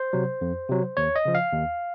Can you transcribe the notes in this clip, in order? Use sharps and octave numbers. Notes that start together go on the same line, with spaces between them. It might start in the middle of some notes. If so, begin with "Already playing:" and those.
Already playing: C5
C3 F#3
F2
C3 F#3
D#2 C#5
D#5
C#3 F3
F5
D#2